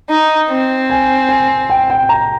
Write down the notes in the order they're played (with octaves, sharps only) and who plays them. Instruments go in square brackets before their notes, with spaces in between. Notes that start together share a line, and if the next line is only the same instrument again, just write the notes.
[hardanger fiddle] D#4
C4
[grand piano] G#5
G#5
G5
G5
A#5